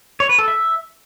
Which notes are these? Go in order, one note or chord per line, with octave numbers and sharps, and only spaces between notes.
C#5
B4
A4
E5